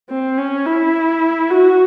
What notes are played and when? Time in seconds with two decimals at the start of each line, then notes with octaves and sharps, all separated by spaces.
0.10 C4
0.37 C#4
0.66 E4
1.50 F#4